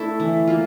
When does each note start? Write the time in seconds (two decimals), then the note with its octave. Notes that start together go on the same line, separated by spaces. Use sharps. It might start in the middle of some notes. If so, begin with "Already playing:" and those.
Already playing: A3 D4 E4 A4
0.20 E3
0.47 A#3 F4